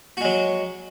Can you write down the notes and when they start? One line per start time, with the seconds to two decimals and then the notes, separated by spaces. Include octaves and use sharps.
0.17 F#4
0.21 G#3
0.25 F#3